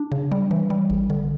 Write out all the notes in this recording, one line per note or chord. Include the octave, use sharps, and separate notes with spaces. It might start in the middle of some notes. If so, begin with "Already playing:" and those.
Already playing: D4
C#3
G3
E3
G3
A1
D3